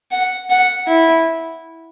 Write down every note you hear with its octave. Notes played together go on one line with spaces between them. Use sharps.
F#5
F#5
E4